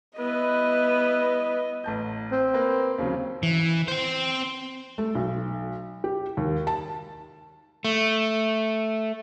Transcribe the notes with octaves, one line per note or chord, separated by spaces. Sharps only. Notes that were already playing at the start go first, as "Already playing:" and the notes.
G3 B3 E4 B4 D#5
A1 A5 G6
C4
A#3 B4
D#2 C#3 F#3
E3
C4 C5
A3
B1
G4
D#2
A5
A3